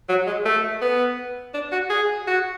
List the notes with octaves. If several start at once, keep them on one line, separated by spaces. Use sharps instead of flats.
F#3
G#3
A3
B3
D4
F#4
G#4
F#4